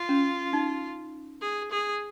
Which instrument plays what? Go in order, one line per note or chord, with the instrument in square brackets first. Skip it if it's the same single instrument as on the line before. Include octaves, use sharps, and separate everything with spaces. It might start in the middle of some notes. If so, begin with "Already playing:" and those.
Already playing: [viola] F4
[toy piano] C#4
D#4
[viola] G#4
G#4